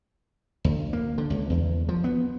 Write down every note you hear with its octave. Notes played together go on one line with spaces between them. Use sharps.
D2
A#3
D3
C#2
E2
F3
B3